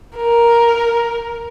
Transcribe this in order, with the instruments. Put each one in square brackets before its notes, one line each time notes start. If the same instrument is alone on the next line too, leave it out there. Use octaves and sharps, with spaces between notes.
[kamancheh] A#4